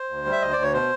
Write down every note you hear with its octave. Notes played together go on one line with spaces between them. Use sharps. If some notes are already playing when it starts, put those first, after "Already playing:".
Already playing: C5
D2
G3
E5
D2 D#5
D2 D5
C#5
B2 C5